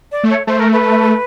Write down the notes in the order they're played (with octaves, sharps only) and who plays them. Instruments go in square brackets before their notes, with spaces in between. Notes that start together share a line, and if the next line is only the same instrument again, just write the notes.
[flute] D5
[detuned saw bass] A3
[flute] C#5
[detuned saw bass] A3 [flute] C5
[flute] A#4
B4